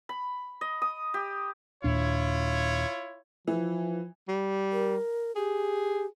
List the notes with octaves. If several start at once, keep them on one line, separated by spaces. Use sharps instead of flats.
B5
D#5
D#6
G4
D#2 A#2 D4 E4 F4 C#5
E3 F3
G3
A#4
G4 G#4